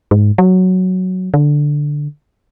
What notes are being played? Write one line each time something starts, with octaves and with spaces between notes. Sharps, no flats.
G#2
F#3
D3